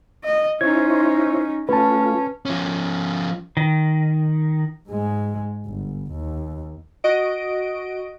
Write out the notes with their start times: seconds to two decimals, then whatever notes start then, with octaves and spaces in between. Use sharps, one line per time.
0.24 D#5
0.61 C#4 D#4 E4 C5 C#5 G#6
1.69 A3 C#4 F4 B4 A5
2.46 F3 C#4
3.57 D#3
4.88 G#2 G#3
5.66 G1
6.11 D#2
7.04 F#4 D#5 D7